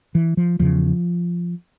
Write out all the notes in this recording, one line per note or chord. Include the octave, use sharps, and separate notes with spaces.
E3
F3
E2 C#3 F3